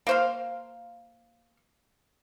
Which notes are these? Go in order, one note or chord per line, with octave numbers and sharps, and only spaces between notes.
A#3 C5 F5